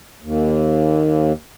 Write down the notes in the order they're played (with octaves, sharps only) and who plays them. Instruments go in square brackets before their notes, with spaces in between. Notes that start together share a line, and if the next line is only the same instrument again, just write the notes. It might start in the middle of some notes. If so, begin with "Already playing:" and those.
[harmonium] D#2